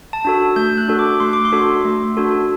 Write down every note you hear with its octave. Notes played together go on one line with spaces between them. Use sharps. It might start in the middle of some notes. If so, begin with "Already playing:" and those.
A5
D4 F#4 A4
A3 G6
F#6
D4 F#4 A4
D6
A3 C6
D6
C6
D4 F#4 A4
A3
D4 F#4 A4